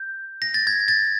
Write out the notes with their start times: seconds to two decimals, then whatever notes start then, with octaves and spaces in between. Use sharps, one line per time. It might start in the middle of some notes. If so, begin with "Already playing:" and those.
Already playing: G6
0.42 A#6
0.54 A6
0.67 G#6
0.88 A6